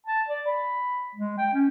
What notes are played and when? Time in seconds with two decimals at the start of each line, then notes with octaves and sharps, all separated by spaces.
0.07 A5
0.28 D5
0.47 B5
1.15 G#3
1.38 G5
1.53 C#4